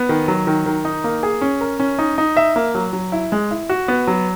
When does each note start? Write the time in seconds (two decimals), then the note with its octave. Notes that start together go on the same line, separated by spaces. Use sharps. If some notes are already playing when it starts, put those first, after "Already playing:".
Already playing: B3
0.09 D#3
0.28 F#3
0.47 D#3
0.66 D#3
0.85 D#4
1.04 A#3
1.23 G#4
1.41 C#4
1.61 A#4
1.80 C#4
1.99 D#4
2.18 D#4
2.37 E5
2.56 A#3
2.75 F#3
2.93 F#3
3.12 E4
3.32 G#3
3.51 E4
3.69 F#4
3.88 B3
4.07 F#3